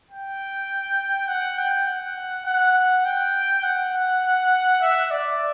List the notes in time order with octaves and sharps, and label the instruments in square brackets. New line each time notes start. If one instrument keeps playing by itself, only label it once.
[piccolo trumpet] G5
F#5
G5
F#5
F#5
G5
F#5
E5
D5